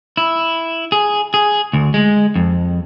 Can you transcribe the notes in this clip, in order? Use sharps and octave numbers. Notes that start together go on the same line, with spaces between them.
E4
G#4
G#4
D2
G#3
F2